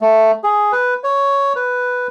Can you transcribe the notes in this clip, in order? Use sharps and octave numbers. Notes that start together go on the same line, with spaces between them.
A3
G#4
B4
C#5
B4